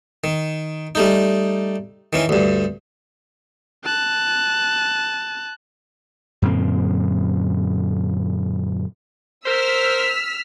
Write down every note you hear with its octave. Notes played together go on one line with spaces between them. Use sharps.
D#3
G3 A3 D#4
D#3 E3 C#4
D2 G2
A5 F#6
F#2 A#2 D3 C4
A#4 C5 E6 F6 B6